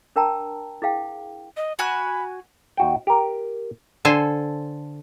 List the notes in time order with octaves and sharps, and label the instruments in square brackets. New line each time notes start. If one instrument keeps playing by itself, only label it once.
[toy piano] D4 A#4 G5 A5 A#5
E4 G#4 F5 G5
[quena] D#5
[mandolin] F#4 G#5 F#6 [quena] B5
[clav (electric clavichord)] D#2 F#4 G5
G4 A#4
[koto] D3 A4 C5 G#5